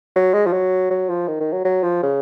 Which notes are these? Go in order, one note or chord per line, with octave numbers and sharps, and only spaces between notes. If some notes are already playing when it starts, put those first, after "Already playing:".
F#3
G#3
F3
F#3
F#3
F3
D#3
D#3
F#3
F#3
F3
C#3